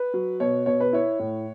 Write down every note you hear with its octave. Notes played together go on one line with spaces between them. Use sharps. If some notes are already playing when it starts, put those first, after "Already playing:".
Already playing: B4
F#3
B2 C#5
B2 C#5
B4
E4 C#5
A2